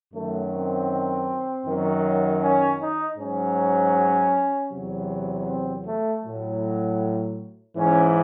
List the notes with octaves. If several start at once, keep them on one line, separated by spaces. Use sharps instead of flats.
F#2 D#3 F#3 A3
C4
F#2 D#3 F#3
C#4
D#4
G#2 F#3 C#4
E2 C3 F#3
C4
A3
A2 F#3
G#2 E3 C#4